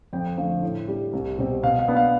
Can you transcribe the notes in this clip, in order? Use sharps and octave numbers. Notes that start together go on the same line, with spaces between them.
F2 G5
D3 F3 A3
A2
G3 D4
C2
B2 G3 C4
B2 F5
F5
B3 D4
F5